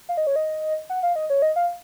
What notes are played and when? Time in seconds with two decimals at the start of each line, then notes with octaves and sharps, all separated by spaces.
0.09 F5
0.17 D#5
0.27 C#5
0.36 D#5
0.90 F#5
1.03 F5
1.16 D#5
1.30 C#5
1.42 D#5
1.56 F5